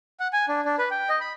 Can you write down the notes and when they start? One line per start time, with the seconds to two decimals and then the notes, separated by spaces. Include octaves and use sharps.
0.20 F#5
0.33 G#5
0.48 D4
0.65 D4
0.78 B4
0.91 G5
1.09 D#5
1.20 B5